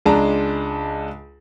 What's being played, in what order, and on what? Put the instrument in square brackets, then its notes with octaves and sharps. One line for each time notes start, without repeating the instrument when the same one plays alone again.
[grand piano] C#2 G#3 D4 A5 A#5